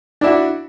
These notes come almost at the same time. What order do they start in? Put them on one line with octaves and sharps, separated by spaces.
D4 E4 F#4